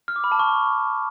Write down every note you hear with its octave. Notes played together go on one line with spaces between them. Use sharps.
F6
D6
B5
A5
C#6